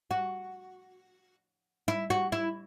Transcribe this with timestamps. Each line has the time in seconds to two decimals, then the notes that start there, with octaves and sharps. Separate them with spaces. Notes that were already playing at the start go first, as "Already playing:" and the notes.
0.11 F#4
1.88 E4
2.10 F#4
2.32 E4